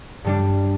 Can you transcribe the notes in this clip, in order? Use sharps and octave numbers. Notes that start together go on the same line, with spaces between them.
G2 G3 D4